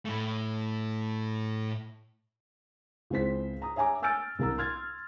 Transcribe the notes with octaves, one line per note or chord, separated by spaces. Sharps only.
A2 A3
C#2 C4 E4 C5 B6
A#5 D#6
C#5 E5 G#5 A#5 D6
G#5 E6 F6 G6 A6 D7
C2 C3 A#4 A#5 E6
C6 F6 G#6 A6